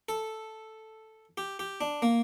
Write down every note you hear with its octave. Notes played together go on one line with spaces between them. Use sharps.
A4
G4
G4
D4
A#3